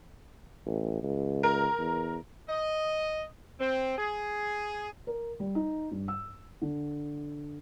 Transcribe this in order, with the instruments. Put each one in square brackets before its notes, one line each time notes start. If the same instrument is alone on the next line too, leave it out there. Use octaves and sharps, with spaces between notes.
[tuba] A1
C#2
[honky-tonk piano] A#4
[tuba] E2
[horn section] D#5
C4
G#4
[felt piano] A#4
G3
D#4
G2
E6
D3